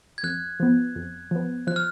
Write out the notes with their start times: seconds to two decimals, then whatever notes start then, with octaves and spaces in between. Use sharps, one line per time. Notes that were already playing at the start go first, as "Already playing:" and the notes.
0.18 G#6
0.23 F2 F#6
0.60 F3 B3
0.96 F2
1.31 F3 B3
1.67 F3 F#6
1.76 F6